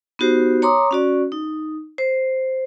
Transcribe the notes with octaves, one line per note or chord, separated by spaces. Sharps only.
B3 D#4 F#4 G4 C5
C#5 A#5 C6 D6 D#6
C#4 F#4 D5
D#4
C5